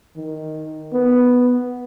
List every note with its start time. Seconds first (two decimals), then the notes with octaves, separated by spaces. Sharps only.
0.16 D#3
0.93 B3